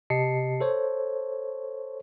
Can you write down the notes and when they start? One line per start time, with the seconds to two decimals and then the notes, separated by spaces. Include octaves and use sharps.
0.10 C3 G4 D#5 A5 C7 C#7
0.60 A4 C5 C#5